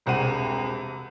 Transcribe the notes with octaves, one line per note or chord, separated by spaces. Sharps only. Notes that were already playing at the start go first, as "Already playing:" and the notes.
E1 C2 C4 F#5 D#7